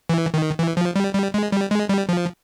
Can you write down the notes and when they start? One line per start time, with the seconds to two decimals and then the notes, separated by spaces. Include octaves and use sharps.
0.09 E3
0.34 D#3
0.59 E3
0.77 F3
0.96 G3
1.15 G3
1.34 G#3
1.52 G3
1.71 G#3
1.89 G3
2.09 F3